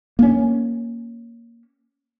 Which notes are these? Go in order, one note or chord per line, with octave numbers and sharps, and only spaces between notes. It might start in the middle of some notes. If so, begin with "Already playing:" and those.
A#3 C#4